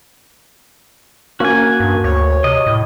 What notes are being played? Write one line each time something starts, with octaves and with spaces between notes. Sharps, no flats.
A#3 C#4 F#4 G#5
G2
D2 C#5
C3 D#5
A2